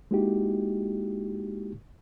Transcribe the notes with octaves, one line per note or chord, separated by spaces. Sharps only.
G#3 A#3 D#4 E4 F#4 G4